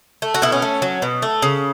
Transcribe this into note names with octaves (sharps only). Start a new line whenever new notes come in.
A3
F#4
B2 E4
C#4
A3
F#3
B2
A3
C#3